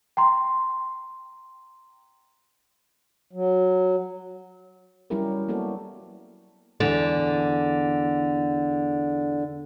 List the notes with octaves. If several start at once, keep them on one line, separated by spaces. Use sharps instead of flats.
G5 A#5 C6
F#3
F#3 G3 C#4 E4 G4 A#4
F#3 A#3 B3 F#4 A4 D5
E2 D3